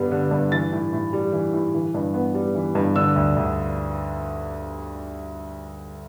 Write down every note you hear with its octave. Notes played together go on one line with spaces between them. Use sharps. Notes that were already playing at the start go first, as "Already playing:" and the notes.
Already playing: G2 D3 G3 B3
D3
G2
E3 A6
A2
A2
G3
E3
A2
E3
G2
B3
G3
E3
G2
D3 E6
D2
D2